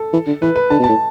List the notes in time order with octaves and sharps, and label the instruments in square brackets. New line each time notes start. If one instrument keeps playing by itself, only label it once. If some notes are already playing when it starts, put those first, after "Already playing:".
Already playing: [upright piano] A4
[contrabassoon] E3
D3
[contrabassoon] E3 [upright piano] B4
[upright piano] B4
[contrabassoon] D3 [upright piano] A5
[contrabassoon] B2
[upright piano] A5
[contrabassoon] A2